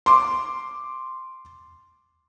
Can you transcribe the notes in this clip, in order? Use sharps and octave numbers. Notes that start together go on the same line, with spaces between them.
C6 D6